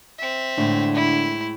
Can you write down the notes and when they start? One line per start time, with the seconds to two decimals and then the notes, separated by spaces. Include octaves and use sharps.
0.19 C4 E5
0.58 A2 D3 G#3
0.95 E4